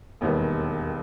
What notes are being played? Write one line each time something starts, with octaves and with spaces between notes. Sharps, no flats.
E1 D#2 D#3 G3 B3